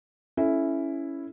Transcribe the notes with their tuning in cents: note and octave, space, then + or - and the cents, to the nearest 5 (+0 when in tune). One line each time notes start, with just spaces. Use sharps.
C#4 +0 E4 +0 A4 -25